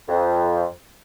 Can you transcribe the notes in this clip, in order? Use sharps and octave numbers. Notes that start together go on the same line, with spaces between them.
F2